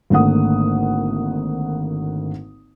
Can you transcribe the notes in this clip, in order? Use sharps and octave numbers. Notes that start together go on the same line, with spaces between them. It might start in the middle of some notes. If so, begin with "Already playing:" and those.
G#1 D3 A3 A#3 F#5 D#6